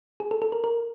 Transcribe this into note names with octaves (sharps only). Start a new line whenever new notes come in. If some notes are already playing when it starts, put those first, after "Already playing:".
G#4
A4
A4
A#4
A#4